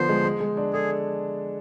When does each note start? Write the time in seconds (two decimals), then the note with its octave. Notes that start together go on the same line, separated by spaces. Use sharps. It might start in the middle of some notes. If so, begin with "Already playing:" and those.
Already playing: D3 F3 B3 C5
0.09 G#3
0.24 G#3
0.40 G#3
0.57 D4
0.73 G#4 A4